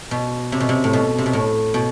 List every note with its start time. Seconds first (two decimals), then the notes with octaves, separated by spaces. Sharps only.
0.11 B2
0.52 C3
0.60 B2
0.69 C3
0.84 A2
0.93 B2
1.18 C3
1.26 B2
1.33 A2
1.74 B2